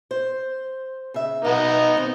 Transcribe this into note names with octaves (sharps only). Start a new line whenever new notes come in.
C5
C#3 E5
B2 B3 D#4
D#3 C4